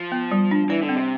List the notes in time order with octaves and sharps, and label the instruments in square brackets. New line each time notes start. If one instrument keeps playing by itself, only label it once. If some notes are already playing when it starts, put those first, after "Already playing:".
Already playing: [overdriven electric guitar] F3
[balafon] B3
G3
D4
[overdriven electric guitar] E3 [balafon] D5
[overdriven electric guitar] D3
[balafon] C4
[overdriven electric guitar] C3